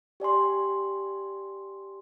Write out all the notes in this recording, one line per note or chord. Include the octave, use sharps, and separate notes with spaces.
G4 D5 G#5 C6